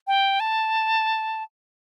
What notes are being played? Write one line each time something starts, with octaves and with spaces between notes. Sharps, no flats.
G5
A5